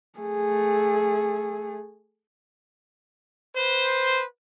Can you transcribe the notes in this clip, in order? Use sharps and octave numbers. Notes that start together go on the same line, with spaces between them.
A3 G#4
B4 C5